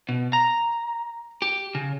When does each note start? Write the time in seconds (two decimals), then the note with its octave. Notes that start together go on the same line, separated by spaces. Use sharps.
0.09 B2
0.33 A#5
1.42 G4
1.75 C#3